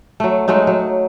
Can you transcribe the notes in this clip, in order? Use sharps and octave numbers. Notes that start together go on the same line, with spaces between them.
F#3 A3
F#3 G#3 A3 D#4
F#3